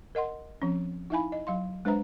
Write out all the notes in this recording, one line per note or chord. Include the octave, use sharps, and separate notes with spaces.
A#4 D#5 F#5 C6
F3 C4 C#4
D#4 E4 E5 F5 G#5 B5
D#5
F#3 F5 C6
G#3 D4 B4 C5 E5 A#5